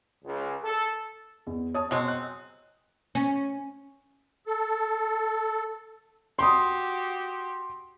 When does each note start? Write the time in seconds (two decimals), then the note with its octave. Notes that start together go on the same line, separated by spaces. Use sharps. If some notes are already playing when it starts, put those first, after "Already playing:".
0.25 C#2
0.64 A4
1.47 E2
1.74 C#5 A5 D#6
1.91 B2 F#3 G#3 C4
2.08 F#6
3.15 C#4
4.47 A4
6.39 F#4 G4 C6 D#6